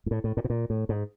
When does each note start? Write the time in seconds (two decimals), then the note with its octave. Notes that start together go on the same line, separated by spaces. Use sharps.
0.06 G#2
0.11 A2
0.24 A2
0.37 A2
0.44 B2
0.50 A#2
0.70 A2
0.89 G#2